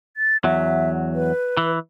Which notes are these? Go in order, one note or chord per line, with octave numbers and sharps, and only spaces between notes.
A6
E2 F#3 E5
B4
E3